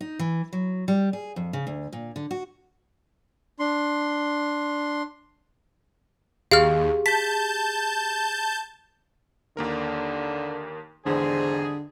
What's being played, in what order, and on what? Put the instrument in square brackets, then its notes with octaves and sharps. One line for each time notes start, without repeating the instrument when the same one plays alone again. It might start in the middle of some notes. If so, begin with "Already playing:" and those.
[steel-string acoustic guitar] D#4
E3
F#3
G3
G#4
F2
C#3
D2
A#2
D3
F#4
[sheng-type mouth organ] D4 C6
[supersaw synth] D#2 [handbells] G4 G#4 [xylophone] F5 F6
[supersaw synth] A5 G6 [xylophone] B6
[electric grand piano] D#2 A#3 A#4 [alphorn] D3
[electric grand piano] G#1 E2 [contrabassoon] D3 [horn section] G3 G#3 G#4 [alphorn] C5